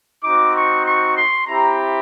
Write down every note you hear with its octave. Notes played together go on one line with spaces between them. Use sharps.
C4 D#4 F#4 D6
C#6
C#6
C6
C4 E4 G4 A#5